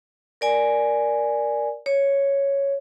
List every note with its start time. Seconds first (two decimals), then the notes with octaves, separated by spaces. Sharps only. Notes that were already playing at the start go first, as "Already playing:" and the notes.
0.41 A#4 D5 G#5
1.86 C#5